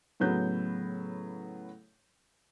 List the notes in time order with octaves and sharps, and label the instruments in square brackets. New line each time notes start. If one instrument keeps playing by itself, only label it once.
[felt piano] A2 C#3 F#3 B3 G6